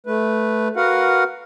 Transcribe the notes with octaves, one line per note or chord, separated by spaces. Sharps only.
A3 B4
F#4 A#4 B4 F5 F#5